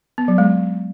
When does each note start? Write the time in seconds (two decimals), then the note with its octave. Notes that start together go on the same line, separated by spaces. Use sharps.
0.18 B3
0.28 F#3
0.38 G#3